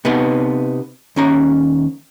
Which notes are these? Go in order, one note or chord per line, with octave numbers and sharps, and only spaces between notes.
C3 B3 D#4 B4
D#2 C#4 A#5